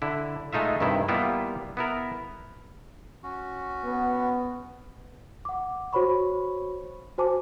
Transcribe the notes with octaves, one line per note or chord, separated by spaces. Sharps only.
D3 E4
G#3 A3 D#4 F4 E5
G2 C3 D#3 E4
G3 A#3 B3 E4 F4
B3 E4 A#4
C#4 F#4
B3
F#5 D6
F#4 C5 C#5 B5 C#6
F#4 C5 G#5 A5 D6